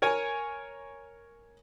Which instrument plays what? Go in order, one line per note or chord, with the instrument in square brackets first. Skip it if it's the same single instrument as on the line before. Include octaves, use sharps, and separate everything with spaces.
[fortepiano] A#4 C#5 G#5